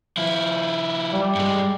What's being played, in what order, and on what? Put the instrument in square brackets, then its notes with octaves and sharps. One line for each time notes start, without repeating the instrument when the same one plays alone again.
[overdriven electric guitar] F3 E4
[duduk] G3
[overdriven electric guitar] G2 G#3